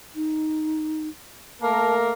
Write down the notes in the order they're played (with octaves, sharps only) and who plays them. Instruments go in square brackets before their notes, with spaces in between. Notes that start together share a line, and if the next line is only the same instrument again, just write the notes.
[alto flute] D#4
[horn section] A3 A#3 A#4 [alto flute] A5